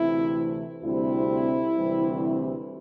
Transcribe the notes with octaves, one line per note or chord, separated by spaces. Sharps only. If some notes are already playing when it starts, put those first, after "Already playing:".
Already playing: D2 C3 E3 A3 C4 E4
D2 C3 G3 C4 E4
D2 C3 E3 G3 C4